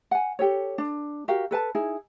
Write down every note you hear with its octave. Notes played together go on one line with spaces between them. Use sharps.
F#5 G#5
G4 A4 C#5
D4
F#4 G4 A#4 F5
A4 B4 G5 A5
D#4 E4 G#4